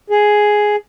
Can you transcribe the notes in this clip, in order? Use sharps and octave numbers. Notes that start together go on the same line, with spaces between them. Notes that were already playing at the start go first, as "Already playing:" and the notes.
G#4